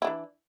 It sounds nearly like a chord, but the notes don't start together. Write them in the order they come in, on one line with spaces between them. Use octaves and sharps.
E4 D4 E3